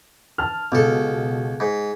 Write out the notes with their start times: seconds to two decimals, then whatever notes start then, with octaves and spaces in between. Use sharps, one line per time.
0.38 A5 F6
0.72 C#2 B2 A4
1.60 G#2